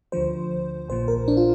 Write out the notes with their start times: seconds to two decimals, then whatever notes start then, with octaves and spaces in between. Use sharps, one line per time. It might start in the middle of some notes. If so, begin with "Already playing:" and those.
0.12 D2 D3 F3 C5
0.88 A#1 A#2 F3 C5
1.08 A#4
1.28 D4
1.37 F4